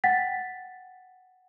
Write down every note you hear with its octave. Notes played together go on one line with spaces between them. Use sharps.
F#5 G5 A6 B6